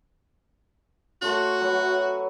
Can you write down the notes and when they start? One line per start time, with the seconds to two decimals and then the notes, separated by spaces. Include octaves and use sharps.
1.22 A3 F#4 C5 C#5
1.61 F#3 B4 C#5